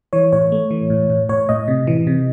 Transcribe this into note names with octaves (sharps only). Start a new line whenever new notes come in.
E3 C#5
A2 C#5
A3
E3
A2
A2
A2 C#5
A2 D#5
C3
E3
C3